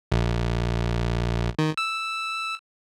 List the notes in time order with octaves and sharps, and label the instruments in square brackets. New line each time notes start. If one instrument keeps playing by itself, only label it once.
[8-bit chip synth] A#1
D#3
E6